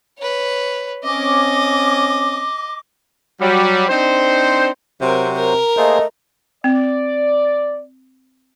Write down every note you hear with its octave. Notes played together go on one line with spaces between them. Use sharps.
B4 C#5
C4 C#4 D#5 D6
F#3 G3
C4 D4 D#4 C5
C3 F#3 C4 F#4 A#4 C5
A#4
A3 A#3 G#4 C5 D#5
C4 D5